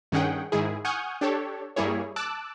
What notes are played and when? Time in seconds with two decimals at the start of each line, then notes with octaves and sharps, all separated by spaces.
0.12 G2 D#3 C#4 G#4 F#5 G5
0.52 G#2 D#3 E4 G#4
0.85 F#5 G#5 C#6 D#6 F6 G6
1.21 D4 G4 A4 C#5
1.76 G2 G3 A#3 E4 G#4 C#5
2.16 A5 D6 E6 F#6